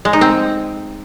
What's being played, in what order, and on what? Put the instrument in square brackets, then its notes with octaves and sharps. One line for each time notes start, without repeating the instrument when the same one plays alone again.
[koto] G#3
D#4
C4